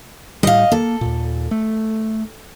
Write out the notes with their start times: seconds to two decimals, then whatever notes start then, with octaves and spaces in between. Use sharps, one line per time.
0.43 A2 G3 D#5 F5
0.72 A#3 A4
1.01 D#2 A#2
1.51 A3